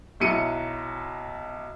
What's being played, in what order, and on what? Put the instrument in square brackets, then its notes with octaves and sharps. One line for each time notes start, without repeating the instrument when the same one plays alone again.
[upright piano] B1 F#3 E4 C#7 D#7